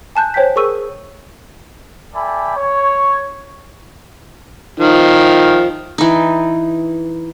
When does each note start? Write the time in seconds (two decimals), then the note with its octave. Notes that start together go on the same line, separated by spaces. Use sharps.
0.15 G#5 A5 F#6 G6
0.34 C5 C#5 G5 G#5 G6 B6
0.56 G#4 A#4 C#6 E6 D#7
2.14 A4 D5 E5 G5 G#5 B5
2.57 C#5
4.80 D#3 F3
5.98 E3 D#4